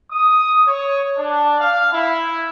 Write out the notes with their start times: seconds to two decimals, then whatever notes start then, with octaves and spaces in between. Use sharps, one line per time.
0.11 D#6
0.66 C#5
1.17 D4
1.60 F5
1.91 E4